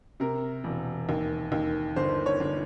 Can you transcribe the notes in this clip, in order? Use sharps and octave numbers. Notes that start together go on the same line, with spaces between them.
C3 A#4
E1
D#2
D#2
G1 C5
C#5
G1